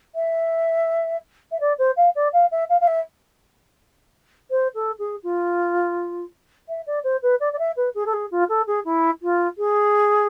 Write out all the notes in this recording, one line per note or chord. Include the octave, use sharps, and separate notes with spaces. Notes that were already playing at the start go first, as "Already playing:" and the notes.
E5
E5
D5
C5
F5
D5
F5
E5
F5
F5
E5
C5
A4
G#4
F4
E5
D5
C5
B4
D5
D5
E5
B4
G#4
A4
G#4
F4
A4
G#4
E4
F4
G#4